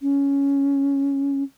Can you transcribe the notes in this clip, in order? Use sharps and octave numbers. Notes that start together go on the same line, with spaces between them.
C#4